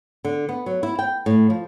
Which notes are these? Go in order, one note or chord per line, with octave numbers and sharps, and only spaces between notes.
D3
B3
F#3
E4
G5
A2
F3